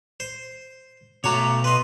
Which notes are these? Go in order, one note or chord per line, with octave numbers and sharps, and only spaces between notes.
C5
B2 A3 F#4 C#5 A#5 D6
B4 D#5 C6